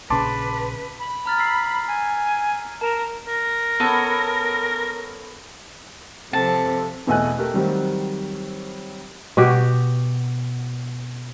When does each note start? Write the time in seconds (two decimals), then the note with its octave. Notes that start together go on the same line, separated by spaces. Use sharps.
0.10 A#1 C#3 B4 A5 C6 D6
0.99 B5
1.26 A#5 F6 A6
1.38 E6 B6 C7
1.88 G#5
2.81 A#4 A5 E7 F7
3.26 A#4
3.80 B3 C#4 A4
6.33 C3 F3 C4 A4 A5
7.07 E2 B2 A3 D#5 G#5 F#6
7.38 A3 G4 A#4
7.54 D#3 F#3 G3 C4 G4
9.37 B2 F#4 G4